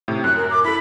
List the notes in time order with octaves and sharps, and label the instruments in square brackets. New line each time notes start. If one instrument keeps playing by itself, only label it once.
[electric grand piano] A2 C3
[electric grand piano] F#2 [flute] F#6
[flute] A#4
D6
[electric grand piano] E4 A4 [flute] B5